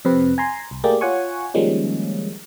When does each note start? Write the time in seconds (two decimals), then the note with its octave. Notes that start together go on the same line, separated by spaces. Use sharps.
0.05 F2 C3 C4 B4
0.38 G#5 A#5 C6
0.71 C2
0.84 A3 A#3 G4 G#4 D5
1.01 F4 C#5 F#5 G#5 C#6
1.54 D#3 F3 G3 G#3 A#3 C#4